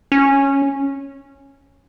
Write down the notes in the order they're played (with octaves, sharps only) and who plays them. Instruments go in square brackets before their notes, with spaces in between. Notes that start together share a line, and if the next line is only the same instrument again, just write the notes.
[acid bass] C#4